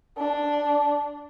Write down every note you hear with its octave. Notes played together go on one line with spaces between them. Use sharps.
D4